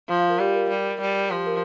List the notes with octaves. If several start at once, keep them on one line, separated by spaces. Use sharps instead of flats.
F3 F4 F5
F4 F5
A#4
G3 G4
A#4
G3
G3
F3 G4
A#4